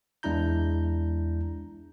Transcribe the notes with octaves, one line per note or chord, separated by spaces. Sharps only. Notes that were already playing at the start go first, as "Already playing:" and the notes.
E2 G#3 D4 E4 A#5 G6